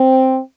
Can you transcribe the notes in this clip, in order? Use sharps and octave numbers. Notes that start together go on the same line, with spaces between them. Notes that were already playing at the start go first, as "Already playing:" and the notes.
Already playing: C4